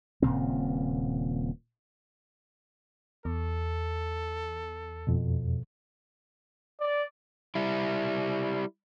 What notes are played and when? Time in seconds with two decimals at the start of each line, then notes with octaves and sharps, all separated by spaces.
0.22 D#1 A#2 C#3 C4
3.25 E2 A4
5.07 F2 B2
6.81 D5
7.55 G3 E4